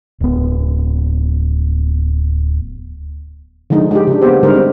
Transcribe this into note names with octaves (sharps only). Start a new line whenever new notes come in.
D1 B3
D3 F3 G#3 D#4
G#3 D#4 G4
C#3 D4
A#3 B3 G4 C5
D3 G3 G#3 D#4 A#4 C5
C4